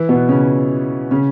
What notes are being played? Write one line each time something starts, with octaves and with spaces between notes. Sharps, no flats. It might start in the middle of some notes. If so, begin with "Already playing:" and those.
Already playing: E3 E4
B2 B3
C#3 C#4
C#3 C#4